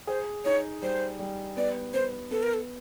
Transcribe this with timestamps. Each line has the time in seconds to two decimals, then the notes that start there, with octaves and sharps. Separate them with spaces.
0.07 G#4 C5
0.45 D#4 C#5
0.82 G3 C5
1.19 G3
1.57 B3 D5
1.94 B3 C5
2.31 B3 A4
2.43 A#4
2.53 A4